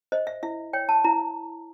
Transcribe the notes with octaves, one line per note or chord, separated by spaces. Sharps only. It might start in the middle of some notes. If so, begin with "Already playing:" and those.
C5 D#5
E5
E4 E5
C#5 G5
A5
E4 A#5